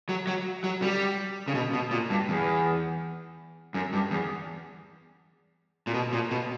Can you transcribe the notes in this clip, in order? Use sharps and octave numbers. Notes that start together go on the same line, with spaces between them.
F#3
F#3
F#3
G3
C#3
B2
B2
A#2
G2
E2
F#2
G2
E2
A#2
B2
A#2
B2